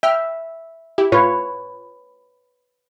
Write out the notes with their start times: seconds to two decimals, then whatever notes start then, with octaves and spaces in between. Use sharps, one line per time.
0.03 E5 G5 F6
0.98 E4 G4
1.12 A2 F4 B4 C#5